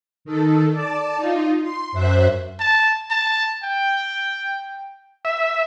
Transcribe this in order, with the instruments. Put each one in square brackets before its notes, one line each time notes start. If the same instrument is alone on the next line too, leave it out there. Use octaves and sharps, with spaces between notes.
[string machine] D#3 A4
D5 A5
D#4 F4
C6
F#2 C5 E5 F#6
[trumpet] A5
A5
G5
[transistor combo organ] E5